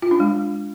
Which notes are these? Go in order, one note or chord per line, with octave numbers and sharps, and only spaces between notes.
F4
D4
G#3